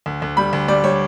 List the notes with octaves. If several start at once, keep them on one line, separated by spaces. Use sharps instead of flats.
D2
D2
G3 B5
D2
G3 D5
G3 C#5